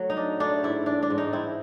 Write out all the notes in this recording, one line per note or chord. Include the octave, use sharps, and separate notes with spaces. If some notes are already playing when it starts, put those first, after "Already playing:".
Already playing: F#3 A3
D#4
D4
A3 D4
G#2 E4
E3 D4
D4
G#2
D#4
C4 E4